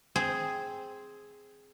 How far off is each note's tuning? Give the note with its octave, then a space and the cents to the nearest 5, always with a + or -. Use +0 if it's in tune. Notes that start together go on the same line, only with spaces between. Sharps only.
C4 +0 G#4 +0